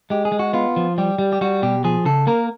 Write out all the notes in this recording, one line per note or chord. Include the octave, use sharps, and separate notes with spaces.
G#3 G4
G#4
G#3
F#4
B3 F4
F3
G3 G4
G3
G4
G3 F#4
B2 G4
F3 G#4
C#3 A4
A#3 A#4